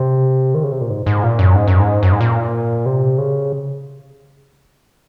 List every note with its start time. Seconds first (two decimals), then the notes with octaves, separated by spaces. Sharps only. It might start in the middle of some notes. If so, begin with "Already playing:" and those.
Already playing: C3
0.54 D#3
0.63 C#3
0.72 C3
0.81 A#2
0.90 G#2
1.06 G#2
1.23 A#2
1.39 F#2
1.55 G#2
1.68 F#2
1.80 G#2
2.03 F#2
2.12 G#2
2.21 A#2
2.86 C3
3.18 C#3